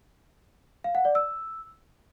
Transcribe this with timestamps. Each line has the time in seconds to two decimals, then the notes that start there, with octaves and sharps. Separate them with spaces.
0.84 F5
0.95 F#5
1.05 D5
1.15 E6